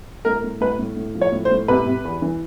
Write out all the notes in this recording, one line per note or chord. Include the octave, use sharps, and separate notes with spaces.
A2 A#4
A2
A2 B4
A2
A2
F3
C#5
A2
C5
A2
C3 B4
C3
E2
E3